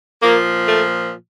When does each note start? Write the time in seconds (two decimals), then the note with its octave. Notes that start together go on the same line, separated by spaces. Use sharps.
0.21 A#2 F3 A#3
0.67 A3